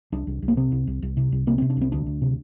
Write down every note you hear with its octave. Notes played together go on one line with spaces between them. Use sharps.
C2 D4
C2
C2
A#3
C3 C4
C2
C2
C2
C3
C2
C3 A#3
C3 C4
D4
C2 C4
D2 D4
D2
C3